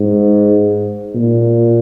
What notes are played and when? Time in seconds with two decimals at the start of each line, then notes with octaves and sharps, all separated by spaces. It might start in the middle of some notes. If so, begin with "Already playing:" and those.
Already playing: G#2
1.15 A#2